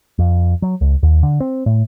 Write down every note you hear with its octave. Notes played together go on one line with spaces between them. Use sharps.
F2
F#3
C#2
D#2
D3
C4
A2